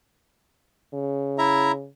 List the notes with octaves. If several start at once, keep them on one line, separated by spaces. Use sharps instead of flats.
C#3
E4 E5 A#5